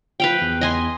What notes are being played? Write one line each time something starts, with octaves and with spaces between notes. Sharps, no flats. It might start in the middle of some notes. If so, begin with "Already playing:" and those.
F3 B4 F5 G5
E2
D#5 G#5 C6